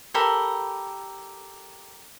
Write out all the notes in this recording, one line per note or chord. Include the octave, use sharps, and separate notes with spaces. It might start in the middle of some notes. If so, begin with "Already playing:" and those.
G4 A4 A#4 B5